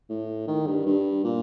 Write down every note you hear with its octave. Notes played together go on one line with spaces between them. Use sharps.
A2
D#3
G2
G2
A#2